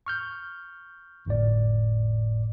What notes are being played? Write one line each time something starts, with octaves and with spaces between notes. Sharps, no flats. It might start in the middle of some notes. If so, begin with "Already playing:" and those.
C#6 F6 G6
G1 F2 A2 D5